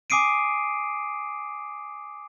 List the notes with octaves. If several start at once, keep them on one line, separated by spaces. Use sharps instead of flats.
G#5 D6 D#6 C7 D7 D#7